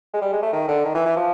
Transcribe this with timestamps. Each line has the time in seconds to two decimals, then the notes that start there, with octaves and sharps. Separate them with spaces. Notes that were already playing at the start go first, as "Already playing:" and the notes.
0.14 G#3
0.22 G3
0.33 G#3
0.43 A3
0.53 D#3
0.68 D3
0.85 D#3
0.95 E3
1.05 E3
1.16 F3